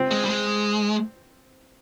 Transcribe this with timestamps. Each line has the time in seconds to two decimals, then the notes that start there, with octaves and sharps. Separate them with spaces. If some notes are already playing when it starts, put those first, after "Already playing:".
Already playing: C4
0.11 G#3
0.25 G3
0.29 G#3